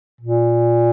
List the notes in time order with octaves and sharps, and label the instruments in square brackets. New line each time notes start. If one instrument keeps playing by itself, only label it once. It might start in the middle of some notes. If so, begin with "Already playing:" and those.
[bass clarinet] A#2